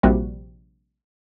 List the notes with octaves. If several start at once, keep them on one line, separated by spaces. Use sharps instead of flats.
A#1 C3 G3 F#4